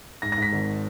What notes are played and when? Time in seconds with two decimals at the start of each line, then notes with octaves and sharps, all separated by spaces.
0.22 G#2 A#6
0.32 A#6
0.38 G#2 B6
0.53 G#1